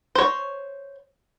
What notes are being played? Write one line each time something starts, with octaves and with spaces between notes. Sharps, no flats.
C5 C#5